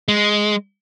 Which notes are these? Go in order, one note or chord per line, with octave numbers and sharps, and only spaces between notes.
G#3